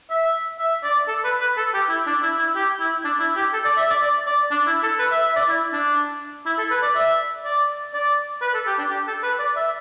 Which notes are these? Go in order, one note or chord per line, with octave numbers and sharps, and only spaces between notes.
E5
E5
D5
A4
B4
B4
A4
G4
E4
D4
E4
E4
G4
E4
D4
E4
G4
A4
D5
E5
D5
D5
D5
D4
E4
A4
B4
E5
E5
D5
E4
D4
E4
A4
B4
D5
E5
D5
D5
B4
A4
G4
D4
G4
A4
B4
D5
E5